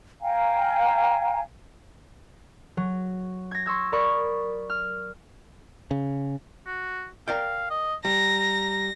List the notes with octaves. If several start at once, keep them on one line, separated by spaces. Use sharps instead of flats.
F5 G5 G#5 A#5
F#3
G#6 A#6
C6 C#6 E6 G#6
A#4 D5 B5 C#6 D#6
F6
C#3
F#4
A#4 D5 F5 G5
D#5
G3 A#5 A#6